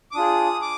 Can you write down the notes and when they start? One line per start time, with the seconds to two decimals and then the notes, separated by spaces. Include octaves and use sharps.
0.11 D6
0.15 D4 F4 G#4 D#6
0.62 D6